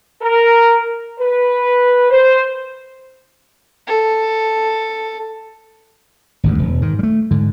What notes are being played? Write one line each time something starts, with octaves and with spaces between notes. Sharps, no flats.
A#4
B4
C5
A4
G#1 D2 G2
E1
G#2 D#3
G3 A3
G#2 D3